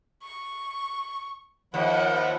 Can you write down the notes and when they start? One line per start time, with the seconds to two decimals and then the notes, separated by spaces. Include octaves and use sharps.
0.23 C#6
1.74 D#2 F3 E4 F#5